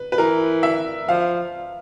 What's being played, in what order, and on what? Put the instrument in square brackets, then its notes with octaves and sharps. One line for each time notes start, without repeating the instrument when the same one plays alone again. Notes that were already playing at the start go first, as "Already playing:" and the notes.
Already playing: [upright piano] B4
B4
[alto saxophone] E3 [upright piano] A#4
[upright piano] E5
[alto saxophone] F3 [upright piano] F5